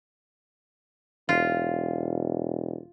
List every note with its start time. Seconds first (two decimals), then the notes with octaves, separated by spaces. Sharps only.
1.29 E1 F4